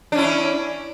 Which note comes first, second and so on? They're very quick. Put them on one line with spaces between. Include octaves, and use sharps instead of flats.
D4 C#4 E4